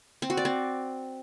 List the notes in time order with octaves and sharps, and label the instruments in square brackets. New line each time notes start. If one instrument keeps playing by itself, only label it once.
[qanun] C4
F#4
D5
C4